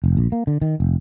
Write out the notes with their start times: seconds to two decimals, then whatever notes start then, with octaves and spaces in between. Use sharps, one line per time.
0.04 F1
0.17 A#1
0.32 A#3
0.47 D3
0.62 D#3
0.80 F1